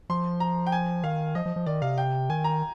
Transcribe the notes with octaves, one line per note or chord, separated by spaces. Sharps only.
F3 C6
A#5
G5
G#5
D#3 F5
F3 D#5
F3
F3
D#3 D5
C3 F5
G5
D#3 G#5
A#5